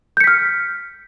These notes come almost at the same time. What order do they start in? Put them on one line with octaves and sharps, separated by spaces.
G6 C#7 B6 F6